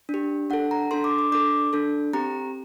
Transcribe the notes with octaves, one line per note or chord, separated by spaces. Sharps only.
D4
G4
D4 A4 F#5
A#5
D4 A4 C6
D6
D6
D4 A4 D6
D4 A4
C4 G4 A#5